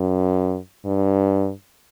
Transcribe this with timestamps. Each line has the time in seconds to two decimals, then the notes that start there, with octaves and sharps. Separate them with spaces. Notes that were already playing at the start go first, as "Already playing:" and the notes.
Already playing: F#2
0.85 G2